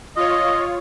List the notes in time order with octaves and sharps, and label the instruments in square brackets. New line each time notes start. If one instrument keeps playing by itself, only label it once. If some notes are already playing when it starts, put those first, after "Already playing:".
[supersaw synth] F4 C#5 [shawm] D#5